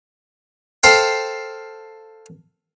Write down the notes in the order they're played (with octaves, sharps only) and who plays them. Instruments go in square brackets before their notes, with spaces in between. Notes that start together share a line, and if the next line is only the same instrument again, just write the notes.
[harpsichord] A4 C5 F5 G5